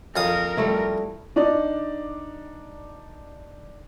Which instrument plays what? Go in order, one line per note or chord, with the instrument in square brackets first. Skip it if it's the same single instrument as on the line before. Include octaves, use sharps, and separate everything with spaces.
[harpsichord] F2 F5 D#6 [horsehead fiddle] A#4
[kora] G3 A3 E4
[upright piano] D4 D#4 D5